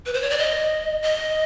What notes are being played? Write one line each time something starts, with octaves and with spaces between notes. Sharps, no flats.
B4
C5
C#5
D5
D#5
D#5